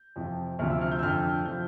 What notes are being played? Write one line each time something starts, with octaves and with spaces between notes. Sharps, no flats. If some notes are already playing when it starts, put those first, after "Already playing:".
Already playing: G6
F2 C3 F3
D2 C3 F3 F6
E6
F6
G6
E6
F2 D3 F3 F6
C3 F3 G6